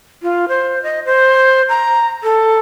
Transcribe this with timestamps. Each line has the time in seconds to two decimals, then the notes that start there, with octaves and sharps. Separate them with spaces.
0.23 F4
0.48 C5
0.83 D#5
1.05 C5
1.69 A#5
2.23 A4